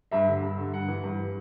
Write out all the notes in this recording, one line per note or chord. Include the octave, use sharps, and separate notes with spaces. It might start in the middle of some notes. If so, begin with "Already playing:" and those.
G2 E5
D3
G2
D3
G2 F#5
E3
G2
E3